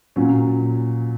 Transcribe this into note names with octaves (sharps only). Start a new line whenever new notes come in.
A#2 F#3 C#4